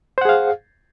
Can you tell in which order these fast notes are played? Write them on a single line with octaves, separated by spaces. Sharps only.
C5 F#5 G#4 F5